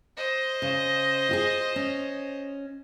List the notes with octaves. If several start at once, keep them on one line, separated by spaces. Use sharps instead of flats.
C5 D#5
C#3
F4 G4 G#4
C#4